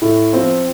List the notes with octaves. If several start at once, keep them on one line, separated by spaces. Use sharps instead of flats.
A2
F3 C4